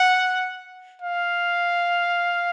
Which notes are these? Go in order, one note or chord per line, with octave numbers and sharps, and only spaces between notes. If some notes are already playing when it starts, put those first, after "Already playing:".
Already playing: F#5
F5